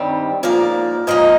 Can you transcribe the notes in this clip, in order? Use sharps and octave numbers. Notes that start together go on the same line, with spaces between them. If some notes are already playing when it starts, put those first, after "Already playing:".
Already playing: G2 D#3 G3 C4
G#2 F3 A#3 D5
G#2 F3 A#3 D#5